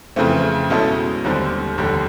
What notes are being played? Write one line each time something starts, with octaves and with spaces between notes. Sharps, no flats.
F2 C#3 E3 A3 C4
B2 G#3 C#4 E4 A4
D#2 D3 G3 C4
F1 D#2 D3 G3